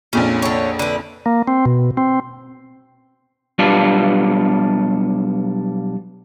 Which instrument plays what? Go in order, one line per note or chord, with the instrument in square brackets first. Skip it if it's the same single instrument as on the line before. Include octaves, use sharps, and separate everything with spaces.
[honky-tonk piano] A#1 F2 A#2 [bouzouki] C#4
[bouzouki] D3 C#5
D3 B4
[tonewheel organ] A#3
C4
B2
C4
[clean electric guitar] B1 G3 B3 D4 F4